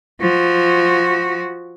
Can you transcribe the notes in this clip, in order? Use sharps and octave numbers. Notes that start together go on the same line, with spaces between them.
F3 F#4